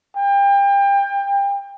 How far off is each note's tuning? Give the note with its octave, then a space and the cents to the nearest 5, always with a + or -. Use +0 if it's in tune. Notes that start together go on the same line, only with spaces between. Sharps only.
G5 +30